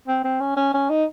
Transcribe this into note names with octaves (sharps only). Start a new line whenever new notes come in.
C4
C4
C#4
C#4
C#4
D#4